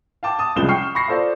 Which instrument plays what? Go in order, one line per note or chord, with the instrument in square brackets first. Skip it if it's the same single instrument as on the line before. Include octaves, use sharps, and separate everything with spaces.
[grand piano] F5 G5 A5 D6
A5 D#6
C2 C#3 F3 G#3 E7 G7
G5 C#6 F6 C7
B5 C#6 A#6 C7
F4 A4 C5 D5 F5